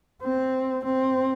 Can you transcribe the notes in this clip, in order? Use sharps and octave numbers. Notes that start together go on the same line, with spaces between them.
C4
C4